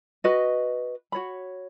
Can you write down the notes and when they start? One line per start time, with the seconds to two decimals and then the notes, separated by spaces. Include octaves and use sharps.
0.24 F#4 B4 D#5
1.12 F#4 C#5 B5